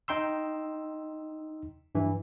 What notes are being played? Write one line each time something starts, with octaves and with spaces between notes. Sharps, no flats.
D#4 G5 C6 E6
G2 E3